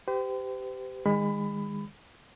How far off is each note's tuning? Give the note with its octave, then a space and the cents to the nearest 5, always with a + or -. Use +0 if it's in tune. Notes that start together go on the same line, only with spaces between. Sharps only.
G4 -10 C5 -40
D#3 +0 G#3 -25 B5 +20